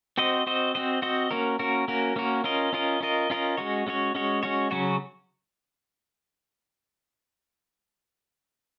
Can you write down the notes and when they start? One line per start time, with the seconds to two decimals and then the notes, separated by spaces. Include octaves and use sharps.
0.17 C4 F#4 C5 D#5
0.47 C4 F#4 C5 D#5
0.75 C4 F#4 C5 D#5
1.02 C4 F#4 C5 D#5
1.31 A#3 C#4 F#4 A#4
1.59 A#3 C#4 F#4 A#4
1.88 A#3 C#4 F#4 A#4
2.16 A#3 C#4 F#4 A#4
2.44 C#4 F4 A#4 D#5
2.73 C#4 F4 A#4 D#5
3.01 C#4 F4 A#4 D#5
3.30 C#4 F4 A#4 D#5
3.57 G#3 C#4 F#4 C#5
3.87 G#3 C#4 F#4 C#5
4.15 G#3 C#4 F#4 C#5
4.43 G#3 C#4 F#4 C#5
4.71 C#3 F#3 C#4 F#4 C#5